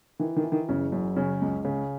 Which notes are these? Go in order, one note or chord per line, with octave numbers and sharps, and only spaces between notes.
D#3 E3
D#3
E3
D#3
F#1 C#3
F#2
C#3 C#4
C#2
C#3